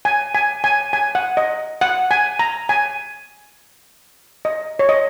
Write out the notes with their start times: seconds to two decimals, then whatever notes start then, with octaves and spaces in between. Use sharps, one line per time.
0.05 G#5
0.35 G#5
0.64 G#5
0.93 G#5
1.15 F#5
1.37 D#5
1.81 F#5
2.11 G#5
2.39 A#5
2.69 G#5
4.45 D#5
4.79 C#5
4.89 D#5